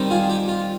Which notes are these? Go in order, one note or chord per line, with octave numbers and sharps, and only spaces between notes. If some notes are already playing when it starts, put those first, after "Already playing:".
Already playing: D#3 G3 C4 D#4
F4 G#4
G4
F4